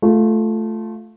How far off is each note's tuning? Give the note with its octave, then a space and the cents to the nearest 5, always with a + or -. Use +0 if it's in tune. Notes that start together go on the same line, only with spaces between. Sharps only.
A3 -5 F4 +5